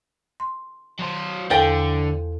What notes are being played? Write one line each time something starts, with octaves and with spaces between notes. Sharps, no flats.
C6
F#3 C5
E2 D3 F3 A4 G5